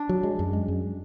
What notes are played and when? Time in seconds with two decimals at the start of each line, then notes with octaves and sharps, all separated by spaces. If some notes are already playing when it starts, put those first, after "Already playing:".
Already playing: D4
0.09 F#3
0.23 G#3
0.39 F#2
0.53 G#3
0.68 F#2